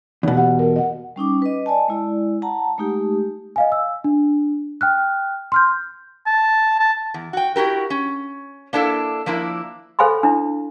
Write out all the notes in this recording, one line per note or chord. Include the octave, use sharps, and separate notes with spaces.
E2 B2 D#4
G4 F#5
A#4
D#5 F#5
G3 C#4 D#4 D6
B4 D#5
D5 D#5 G#5 A5
G#3 E4 D5
F#5 A5 A#5
G#3 A3 D#4 G4
D#5 F5 G#5
E6
D4
G5 F6 F#6
C6 F6 G6
A5
A5
E2
F#4 G5
E4 F#4 G4 A#4
C#4
A#3 D4 E4 A4 E5
F3 A#3 D4 E4
A4 C5 F5 G#5 B5 C6
D4 E4